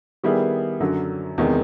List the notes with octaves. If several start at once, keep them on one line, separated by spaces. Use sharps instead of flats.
D#3 G3 B3 E4 G#4
F#2 D3 F#3
E2 C3 D#3 G#3